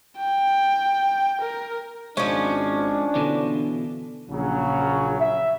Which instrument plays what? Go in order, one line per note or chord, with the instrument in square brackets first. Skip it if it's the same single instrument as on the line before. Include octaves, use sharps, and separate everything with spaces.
[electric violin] G5
A#4
[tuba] G#1 [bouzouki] F3 C#4 [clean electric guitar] G#3 [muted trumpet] D4
[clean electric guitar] B2 E3 [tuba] D3
[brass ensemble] A#1 C#3 F#3
E5